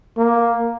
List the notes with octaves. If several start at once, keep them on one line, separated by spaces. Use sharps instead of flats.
A#3